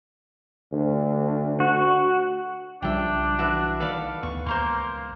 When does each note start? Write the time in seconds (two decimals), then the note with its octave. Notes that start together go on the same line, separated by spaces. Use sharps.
0.73 D2
1.60 F#4
2.82 B1 C#3 F3 G3 D4 E5 G5
3.39 E3 F#4 B4 E5
3.80 D#3 A4 B4 D5 F5
4.23 D2 B3 C#6
4.46 C#2 A#3 C5 A#5 C6